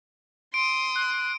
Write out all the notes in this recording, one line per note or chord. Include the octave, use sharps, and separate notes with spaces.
C6 D#6 D7
F#6